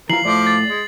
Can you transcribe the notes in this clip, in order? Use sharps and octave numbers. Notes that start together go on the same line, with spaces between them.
E3 F4 A#4 C7 F#7
A2 F3 A3 D5 D6
A6
G#3